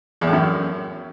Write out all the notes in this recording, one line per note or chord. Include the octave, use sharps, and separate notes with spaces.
E2
A2
F#2